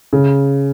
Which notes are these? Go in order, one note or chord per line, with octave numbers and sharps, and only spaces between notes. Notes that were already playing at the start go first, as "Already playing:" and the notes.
C#3